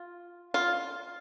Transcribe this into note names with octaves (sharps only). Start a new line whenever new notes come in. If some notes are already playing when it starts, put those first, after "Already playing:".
Already playing: F4
F4